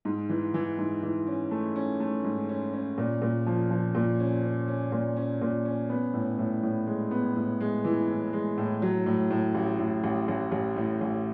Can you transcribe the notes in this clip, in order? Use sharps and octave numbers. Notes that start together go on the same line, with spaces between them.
G#2
E3
E3
G#2
E3
C#4
A3
C#4
A3
G#2
C#4
C#4
A#2
A#2
F3
F3
A#2
C#4
C#4
C#4
A#2
C#4
A#2
C#4
B3
A2
A2
A2
G#3
B3
A2
G#3
E3
A2
G#3
A2
F#3
A2
A2
A1
A2
A1
A1
A1
A2
A1